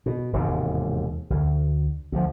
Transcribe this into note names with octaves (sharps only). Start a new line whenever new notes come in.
B2
E1 D#2 G#2 C3
D2
D2 F3